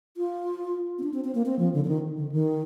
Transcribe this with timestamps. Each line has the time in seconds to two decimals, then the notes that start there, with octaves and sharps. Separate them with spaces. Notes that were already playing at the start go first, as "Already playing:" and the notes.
0.17 F4
0.99 C4
1.03 D4
1.14 C4
1.24 C4
1.35 A#3
1.46 C4
1.59 F3
1.74 D3
1.84 D3
1.88 D#3
2.17 D3
2.32 D#3